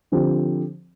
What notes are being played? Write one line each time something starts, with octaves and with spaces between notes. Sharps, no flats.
D3 F3 C4 G4